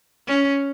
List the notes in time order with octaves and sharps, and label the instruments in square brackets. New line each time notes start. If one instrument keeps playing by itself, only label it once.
[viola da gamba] C#4